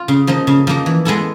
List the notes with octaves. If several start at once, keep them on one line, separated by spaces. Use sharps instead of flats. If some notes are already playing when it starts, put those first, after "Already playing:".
Already playing: F4
C#3
F3 A#3 D#4
C#3
F3 A#3 D#4
E3
G#3 B3 E4 A4